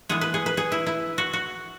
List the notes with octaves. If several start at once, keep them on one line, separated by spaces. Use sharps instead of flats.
E3 G#3 B3 G#4
B4
G#4
B4
G#4
E4
E4
F#4
F#4